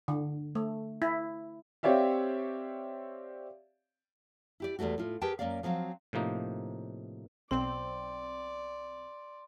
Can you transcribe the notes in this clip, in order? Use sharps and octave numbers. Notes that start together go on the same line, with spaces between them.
D3
A3
E4
C4 G4 C#5 D5 E5 F5
E4 G4 D5
E2 C3 G3 A3 F#4
A2 F4
G4 G#4 A#4 B4 G5 A5
F#2 G#3 A#3 D5 F5
F3 F#3 C4 F5
A2 C3 F3 A#3 D#4
B1 C4 D5 C6